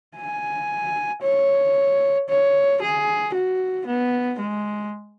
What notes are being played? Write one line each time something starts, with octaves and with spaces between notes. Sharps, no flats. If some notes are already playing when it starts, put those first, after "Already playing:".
G#5
C#5
C#5
G#4
F#4
B3
G#3